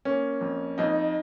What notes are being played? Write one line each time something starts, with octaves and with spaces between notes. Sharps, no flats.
A#3 C#4
F2
F2 D#4